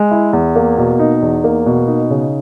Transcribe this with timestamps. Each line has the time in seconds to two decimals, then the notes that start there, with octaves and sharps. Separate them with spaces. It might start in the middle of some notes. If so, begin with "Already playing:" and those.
Already playing: G#3
0.11 E4
0.33 E2
0.56 A#3
0.78 B2
0.99 D#4
1.22 E2
1.44 A#3
1.66 B2
1.88 D#4
2.10 C#3